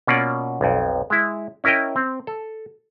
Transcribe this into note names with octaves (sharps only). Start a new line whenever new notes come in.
B2 A#3 C#4 F4 D5
B1 F2
G#3 E4
C#4 E4 A#4 D#5 G5
C4
A4